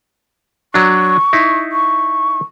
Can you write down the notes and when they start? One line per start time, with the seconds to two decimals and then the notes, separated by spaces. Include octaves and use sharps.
0.74 F#3 D4 C#6
1.33 D#4 E4
1.72 C#6